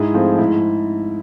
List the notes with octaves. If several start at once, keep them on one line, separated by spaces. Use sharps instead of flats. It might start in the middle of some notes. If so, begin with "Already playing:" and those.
Already playing: G#2 E4 G#4
F3 A3 C4
G#2 E4